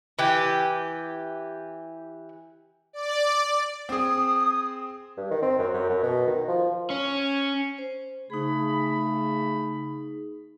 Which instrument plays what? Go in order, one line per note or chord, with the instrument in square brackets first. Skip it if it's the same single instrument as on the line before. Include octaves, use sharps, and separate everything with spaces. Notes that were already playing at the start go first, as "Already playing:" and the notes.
[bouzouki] E3 G4
[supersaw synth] D5
[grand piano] C4 G#4 [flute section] D#6
[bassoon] G2
D#3
C4
F#2
F#2
F#2
B2
D#3
F3
[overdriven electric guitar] C#4
[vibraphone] C5
[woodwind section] C#3 A3 B5 [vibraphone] D#4 G#4